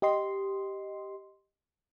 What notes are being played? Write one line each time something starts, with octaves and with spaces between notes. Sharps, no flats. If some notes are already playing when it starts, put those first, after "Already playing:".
G4 D#5 C6